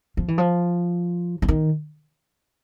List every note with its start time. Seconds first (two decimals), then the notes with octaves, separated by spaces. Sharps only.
0.17 F3
0.28 E3
0.38 F3
1.42 E3
1.48 D#3